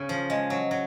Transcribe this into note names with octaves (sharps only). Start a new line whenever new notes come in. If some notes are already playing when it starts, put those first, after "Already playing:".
Already playing: C#3
F3
G#3
F#3
F#3